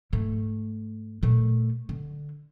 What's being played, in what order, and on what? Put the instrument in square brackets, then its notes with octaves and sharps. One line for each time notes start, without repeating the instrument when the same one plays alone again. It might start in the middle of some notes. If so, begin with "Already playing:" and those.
[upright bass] G#2 A3
A#2 A3
D3